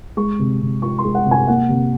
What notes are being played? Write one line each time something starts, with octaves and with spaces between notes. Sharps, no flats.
G#3 C#6
C3
C3
F3 C#6
C6
G#3
F#5
C3
G#5
A#3 F#5
C3